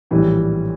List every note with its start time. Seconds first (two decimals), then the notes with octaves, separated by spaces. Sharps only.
0.11 A#1 A2 E3 G3